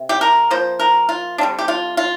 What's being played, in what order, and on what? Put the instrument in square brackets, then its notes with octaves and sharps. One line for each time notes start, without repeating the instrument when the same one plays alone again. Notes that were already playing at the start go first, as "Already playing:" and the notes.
Already playing: [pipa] C3
G4
A#4
F3 A#3 C5
A#4
F4
D3 G3 C4 D4
G4
F4
F4